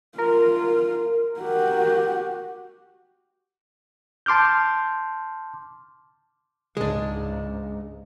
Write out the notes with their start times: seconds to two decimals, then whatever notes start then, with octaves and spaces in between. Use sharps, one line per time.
0.18 F4 A#4
1.40 F#4 G4
4.26 A5 C6 D6 F6 G6
6.77 C#2 G#2 G#3 D4